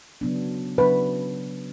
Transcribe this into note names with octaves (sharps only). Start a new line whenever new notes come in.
C#3 F#3 B3 D4
C#3 F#3 B3 D4 B4